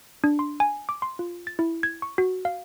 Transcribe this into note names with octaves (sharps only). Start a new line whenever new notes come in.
D4
C6
G#5
D6
C6
F4
A6
E4
G#6
C#6
F#4
F5